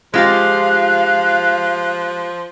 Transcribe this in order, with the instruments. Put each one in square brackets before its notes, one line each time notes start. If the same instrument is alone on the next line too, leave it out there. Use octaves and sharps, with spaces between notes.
[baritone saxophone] F3 [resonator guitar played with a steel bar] G#3 F4 G4 [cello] F5 [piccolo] F#6